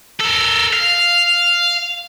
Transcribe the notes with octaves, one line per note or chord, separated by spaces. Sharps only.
A4 A#4
F5